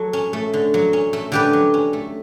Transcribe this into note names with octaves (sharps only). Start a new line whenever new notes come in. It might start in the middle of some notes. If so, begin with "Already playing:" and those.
Already playing: F#3 A3 A4 C#5
C#4
A3
D3
F#3
C#4
A3
D3 G4 B4
F#3
C#4
A3